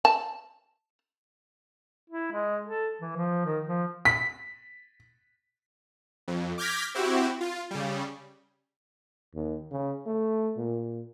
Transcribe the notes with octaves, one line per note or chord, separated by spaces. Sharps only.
A5
E4
G#3
A4
E3
F3
D#3
F3
B6
F2
D6 F6 G6 G#6 A#6 B6
C4 E4 F#4 G4
F4
C#3 G3
D#2
C#3
A3
A#2